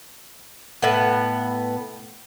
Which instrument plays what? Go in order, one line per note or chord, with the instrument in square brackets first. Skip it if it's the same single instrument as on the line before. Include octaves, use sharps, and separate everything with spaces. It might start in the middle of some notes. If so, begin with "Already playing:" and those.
[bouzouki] A2 B3